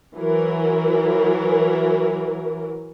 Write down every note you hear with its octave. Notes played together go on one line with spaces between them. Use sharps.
E3 F#3 A#4